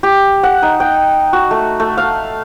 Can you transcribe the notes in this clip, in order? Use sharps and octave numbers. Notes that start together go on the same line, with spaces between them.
G4
F#5
D#4
G5
F#4
A3
A3
F5